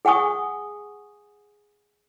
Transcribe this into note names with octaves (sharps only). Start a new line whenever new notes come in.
G#4 F#5 G#5 C#6 D#6